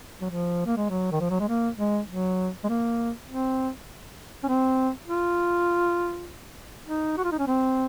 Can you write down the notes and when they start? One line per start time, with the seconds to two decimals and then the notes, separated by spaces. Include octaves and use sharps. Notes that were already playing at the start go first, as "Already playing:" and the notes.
0.21 F#3
0.30 F3
0.66 A#3
0.77 G#3
0.90 F#3
1.12 D#3
1.20 F3
1.30 F#3
1.40 G#3
1.49 A#3
1.79 G#3
2.08 F#3
2.64 G#3
2.69 A#3
3.28 C4
4.43 C#4
4.48 C4
5.08 F4
6.87 D#4
7.17 F#4
7.24 F4
7.32 D#4
7.39 C#4
7.47 C4